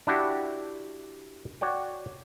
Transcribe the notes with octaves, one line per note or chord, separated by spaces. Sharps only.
D4 E4 F#4 G4
F#4 C#5 D5 G5